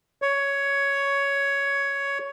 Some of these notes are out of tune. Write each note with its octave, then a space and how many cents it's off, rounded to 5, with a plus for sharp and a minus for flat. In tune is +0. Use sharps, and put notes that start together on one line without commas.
C#5 +10